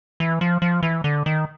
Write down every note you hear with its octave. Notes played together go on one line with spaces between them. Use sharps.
E3
F3
F3
E3
D3
D#3